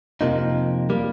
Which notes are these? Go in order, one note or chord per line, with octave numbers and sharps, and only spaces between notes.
F2 C3 F3 A#3 D#4
G3 A#3